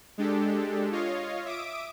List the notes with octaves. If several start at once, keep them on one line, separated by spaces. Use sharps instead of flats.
G#3 D4 G4 A4
F4 C#5 D#5 F5
E5 D6 D#6 D7